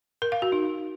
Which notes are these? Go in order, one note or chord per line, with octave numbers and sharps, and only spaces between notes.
A#4
F5
F#4
D#4